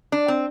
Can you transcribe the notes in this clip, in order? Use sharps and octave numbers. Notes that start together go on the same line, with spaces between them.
D4
C4